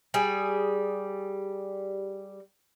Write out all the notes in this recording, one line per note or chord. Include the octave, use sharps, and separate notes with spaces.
G3 G#4